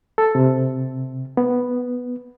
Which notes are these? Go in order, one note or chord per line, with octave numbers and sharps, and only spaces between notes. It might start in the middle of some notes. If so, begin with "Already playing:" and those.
A4
C3
B3